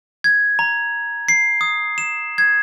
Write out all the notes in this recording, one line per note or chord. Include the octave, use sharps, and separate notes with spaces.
G#6
A#5
C7
D#6
E7
G#6